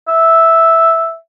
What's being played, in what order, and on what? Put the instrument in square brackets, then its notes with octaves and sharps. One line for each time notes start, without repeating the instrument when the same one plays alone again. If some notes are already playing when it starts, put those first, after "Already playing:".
[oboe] E5